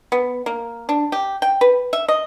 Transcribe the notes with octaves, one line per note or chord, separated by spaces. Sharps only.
B3
A#3
D4
G4
G5
B4
E5
D#5